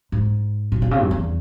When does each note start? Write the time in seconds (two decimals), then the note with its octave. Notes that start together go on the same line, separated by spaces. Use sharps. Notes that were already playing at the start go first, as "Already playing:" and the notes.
0.12 G#2
0.72 B2
0.82 B2
0.91 C#3
1.02 F#2
1.11 E2